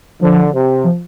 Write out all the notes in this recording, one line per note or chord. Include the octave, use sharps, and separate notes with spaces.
D3 F3
C3
F3